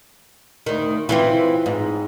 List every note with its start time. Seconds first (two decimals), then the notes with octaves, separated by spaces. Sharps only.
0.66 D2 D#3
1.09 E3 C4 F4
1.66 G#2